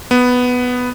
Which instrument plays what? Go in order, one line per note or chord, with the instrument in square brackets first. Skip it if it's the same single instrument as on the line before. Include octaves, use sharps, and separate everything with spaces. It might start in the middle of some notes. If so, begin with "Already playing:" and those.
[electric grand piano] B3